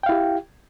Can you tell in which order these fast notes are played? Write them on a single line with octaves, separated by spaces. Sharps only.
G5 F5 E4 G4